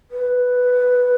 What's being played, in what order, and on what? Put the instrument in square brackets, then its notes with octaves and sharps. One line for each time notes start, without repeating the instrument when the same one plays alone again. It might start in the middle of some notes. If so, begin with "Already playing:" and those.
[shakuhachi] B4